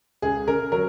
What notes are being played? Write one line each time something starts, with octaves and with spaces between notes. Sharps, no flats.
C#2 G#4
C#3 A#4
F#3 A#4